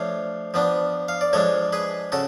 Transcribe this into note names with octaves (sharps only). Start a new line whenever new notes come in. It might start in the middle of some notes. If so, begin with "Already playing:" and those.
Already playing: F3 A3 D4 C#5 F5
F3 B3 D4
F5
D5
F3 G#3 D4 A4 C#5
G#4 B4
C#3 F#4 A4